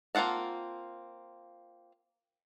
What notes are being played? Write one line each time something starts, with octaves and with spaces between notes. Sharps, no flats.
A#3 C4 F4 F#5 A5